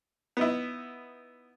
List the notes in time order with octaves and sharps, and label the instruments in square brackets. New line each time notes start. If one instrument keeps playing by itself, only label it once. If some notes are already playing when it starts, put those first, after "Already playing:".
[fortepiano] B3 D#4 E4